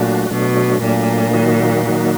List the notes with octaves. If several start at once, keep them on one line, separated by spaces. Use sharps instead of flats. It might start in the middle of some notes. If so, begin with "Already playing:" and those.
Already playing: A#2 F#3 A3 D4 F#4
B2 F#3 A3 D4
A#2 F#3 A3 D4
D#3 F#3 A#3 D#4 F#4
D#3 F#3 A#3 D#4 F#4